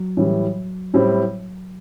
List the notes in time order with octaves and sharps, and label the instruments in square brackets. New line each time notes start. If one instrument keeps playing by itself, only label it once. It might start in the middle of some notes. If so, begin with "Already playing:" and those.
Already playing: [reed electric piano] F#3
[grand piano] A2 E3 G3
A2 G3 C4 E4